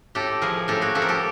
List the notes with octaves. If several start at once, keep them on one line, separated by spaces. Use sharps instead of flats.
A2 G4 A4
F3 G#4 A#4
A2 G4 A4
F#4 G#4
F3 G4 A4
A#4
G4 A4